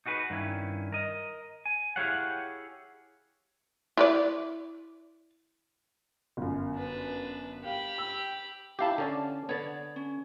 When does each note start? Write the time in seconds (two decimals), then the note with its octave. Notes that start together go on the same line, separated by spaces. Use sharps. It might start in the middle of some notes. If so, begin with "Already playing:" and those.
0.06 D#4 F#4 G#4 B4
0.30 G2 D#3 C#4 E4
0.92 A#4 D#5
1.65 G#5
1.96 E4 G4 G#4 C#5 F5 F#5
3.97 E4 B4 D5
6.37 G1 F#2
6.76 D4 B4
7.64 G4 F5 B5
7.98 E6
8.79 D4 E4 G4 F5 A5
8.98 D3 C#4 D5 A5
9.49 D3 B3 C#5 D5
9.96 C#4